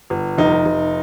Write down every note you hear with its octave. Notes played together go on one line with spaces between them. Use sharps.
G1
F1 D#4
F1